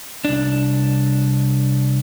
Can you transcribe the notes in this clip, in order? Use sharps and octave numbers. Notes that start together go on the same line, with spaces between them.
C2 D4